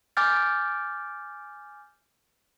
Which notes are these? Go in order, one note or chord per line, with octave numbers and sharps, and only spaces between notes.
G#5 D6 F6 G6 A6